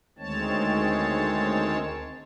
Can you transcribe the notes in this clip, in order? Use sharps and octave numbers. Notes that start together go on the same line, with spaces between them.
D2 D#3 G#3 C4 C#5 A5